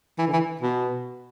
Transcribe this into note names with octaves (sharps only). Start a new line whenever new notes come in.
E3
D3
E3
B2